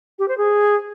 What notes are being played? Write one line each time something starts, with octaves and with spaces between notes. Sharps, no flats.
G4
C5
G#4